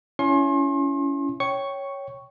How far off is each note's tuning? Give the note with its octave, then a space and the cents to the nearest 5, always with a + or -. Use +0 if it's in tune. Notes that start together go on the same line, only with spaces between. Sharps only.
C#4 +20 E4 +20 C6 +40
C#5 +0 G5 -10 C#6 +0